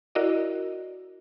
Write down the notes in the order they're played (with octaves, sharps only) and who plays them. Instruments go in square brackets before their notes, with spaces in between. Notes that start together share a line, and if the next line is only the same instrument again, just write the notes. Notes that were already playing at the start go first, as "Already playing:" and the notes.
[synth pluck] E4 F#4 A#4 D5 D#5